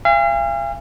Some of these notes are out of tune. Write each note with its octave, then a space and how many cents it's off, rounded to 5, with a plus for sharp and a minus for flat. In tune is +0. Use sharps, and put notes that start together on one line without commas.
F5 -40 G#5 -40